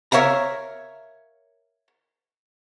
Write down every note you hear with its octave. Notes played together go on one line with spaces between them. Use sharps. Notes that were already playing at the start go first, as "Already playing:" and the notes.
A#4 C#5 E5 F5 A#5